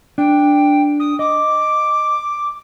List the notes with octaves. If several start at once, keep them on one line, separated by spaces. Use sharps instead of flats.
D4 G5
D#6
D#5 D6